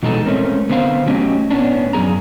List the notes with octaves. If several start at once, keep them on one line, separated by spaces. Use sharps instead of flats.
B2 E3 G#3 D#4 G#4 A4
G#3 A3 C4 C#4 A#4
D3 B3 C4 C5 F5
F#3 A3 C#4 G4 D#5
A2 B3 C#4 D4
F#2 D#3 G#4 A#5